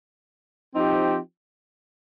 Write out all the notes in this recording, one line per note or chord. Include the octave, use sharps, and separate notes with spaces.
F3 C4 D#4 G4